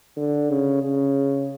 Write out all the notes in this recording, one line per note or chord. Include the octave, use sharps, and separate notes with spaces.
D3
C#3
C#3